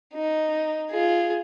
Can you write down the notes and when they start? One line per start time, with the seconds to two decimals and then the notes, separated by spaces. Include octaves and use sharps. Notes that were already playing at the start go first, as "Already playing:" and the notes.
0.14 D#4
0.90 F4 G#4